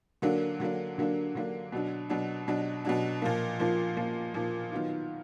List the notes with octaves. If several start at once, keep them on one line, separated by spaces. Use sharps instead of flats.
D3 F#3 A#3 D4
D3 F#3 A#3 D4
D3 F#3 A#3 D4
D3 F#3 A#3 D4
B2 F#3 D4
B2 F#3 D4
B2 F#3 D4
B2 F#3 D4
A#2 F3 A#3
A#2 F3 A#3
A#2 F3 A#3
A#2 F3 A#3
D#3 F#3 B3 F4